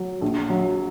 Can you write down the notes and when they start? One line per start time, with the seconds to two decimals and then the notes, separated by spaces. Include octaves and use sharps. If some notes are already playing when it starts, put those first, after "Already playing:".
Already playing: F#3
0.21 A#1
0.50 F#3